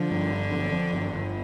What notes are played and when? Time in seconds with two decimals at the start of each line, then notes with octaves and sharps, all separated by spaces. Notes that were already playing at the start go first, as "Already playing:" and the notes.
Already playing: D3 F3
0.11 G2
0.31 G1
0.52 F2
0.72 F2
0.93 G1
1.13 G1